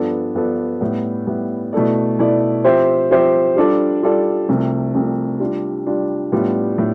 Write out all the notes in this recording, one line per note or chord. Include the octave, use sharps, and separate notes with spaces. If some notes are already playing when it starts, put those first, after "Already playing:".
Already playing: G2 F3 B3 D4 A4
G2 F3 B3 D4 A4
A2 G3 B3
A2 G3 B3
B2 A3 E4 A4 D5
B2 A3 E4 A4 D5
F3 C4 G4 C5 E5
F3 C4 G4 C5 E5
G3 D4 F4 A4 D5
G3 D4 F4 A4 D5
C2 C3 F3 A3
C2 C3 F3 A3
G3 D4 F4
G3 D4 F4
A2 G3 B3 D4 F4
A2